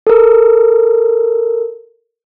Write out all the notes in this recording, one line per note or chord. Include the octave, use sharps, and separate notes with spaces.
A4 A#4